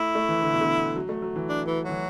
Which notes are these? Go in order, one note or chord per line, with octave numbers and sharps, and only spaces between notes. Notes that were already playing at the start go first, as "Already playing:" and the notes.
Already playing: A3 E4
A3
E3
D3
B2
D3
F#3
A3
F#3
E3
D4
E3
E3 F#3